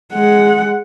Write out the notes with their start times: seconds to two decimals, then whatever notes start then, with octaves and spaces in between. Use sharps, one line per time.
0.13 G#3 F#5